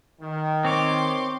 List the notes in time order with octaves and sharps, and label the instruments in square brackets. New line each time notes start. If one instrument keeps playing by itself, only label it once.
[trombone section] D#3
[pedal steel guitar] C4 C#5 [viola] C6 D6